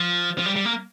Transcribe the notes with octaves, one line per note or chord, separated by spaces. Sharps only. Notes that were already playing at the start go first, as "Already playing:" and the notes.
Already playing: F3
F3
G3
G3
A#3